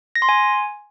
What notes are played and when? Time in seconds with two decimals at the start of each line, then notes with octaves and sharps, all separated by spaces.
0.15 A#6
0.22 C6
0.29 G#5